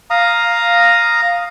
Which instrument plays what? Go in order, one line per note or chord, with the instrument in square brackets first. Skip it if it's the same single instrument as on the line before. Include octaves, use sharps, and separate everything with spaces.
[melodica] F5 A#5 D#6